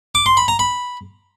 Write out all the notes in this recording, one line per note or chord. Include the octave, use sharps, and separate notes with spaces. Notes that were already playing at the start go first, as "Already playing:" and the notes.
D6
C6
B5
A#5
B5